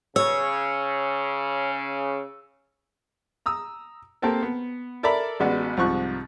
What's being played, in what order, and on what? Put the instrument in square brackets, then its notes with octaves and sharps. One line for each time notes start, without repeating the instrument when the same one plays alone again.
[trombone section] C#3 [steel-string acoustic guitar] C#5 [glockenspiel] E6
[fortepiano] A#5 D#6 E6
A#3 C4 G4 A4 A#4
B3
A4 A#4 D5 E5 A#5 B5
A1 G#3 B3 F#4 D5
C2 G#2 F3 C#6 F#6